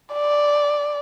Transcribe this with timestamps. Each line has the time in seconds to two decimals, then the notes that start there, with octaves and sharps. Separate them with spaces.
0.13 D5